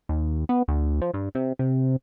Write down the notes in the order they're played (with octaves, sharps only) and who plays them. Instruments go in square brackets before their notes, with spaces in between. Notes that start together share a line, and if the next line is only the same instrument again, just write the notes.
[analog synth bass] D#2
B3
D2
F3
G2
C3
C3